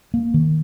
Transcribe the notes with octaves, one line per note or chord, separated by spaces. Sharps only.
A#3
D#3